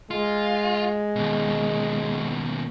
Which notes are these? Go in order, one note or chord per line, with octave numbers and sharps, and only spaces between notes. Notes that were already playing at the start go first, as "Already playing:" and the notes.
G#3 F4
D#2 B2